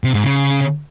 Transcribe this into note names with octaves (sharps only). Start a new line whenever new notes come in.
C3
G#2
C#3